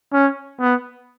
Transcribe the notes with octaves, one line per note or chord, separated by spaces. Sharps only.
C#4
B3